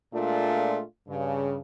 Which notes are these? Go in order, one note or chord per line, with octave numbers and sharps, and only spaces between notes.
A#2 G#3 A3 D4 F4
G2 C#3